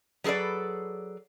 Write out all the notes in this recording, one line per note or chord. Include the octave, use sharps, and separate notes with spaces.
F#3 G#4 A4 B4 D5